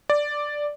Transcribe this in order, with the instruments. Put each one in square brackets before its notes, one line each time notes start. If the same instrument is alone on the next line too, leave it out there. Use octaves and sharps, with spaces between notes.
[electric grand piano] D5